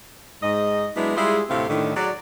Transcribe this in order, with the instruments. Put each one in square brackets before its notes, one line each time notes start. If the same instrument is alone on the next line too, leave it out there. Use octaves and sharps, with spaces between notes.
[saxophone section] G#2 D#5
F#3 G#3 B3 D4 E4
G3 G#3 E4 F4 G#4
D2 A2 C3 C4 A4 F5
A2 D3 D#3
F#3 G#3 D5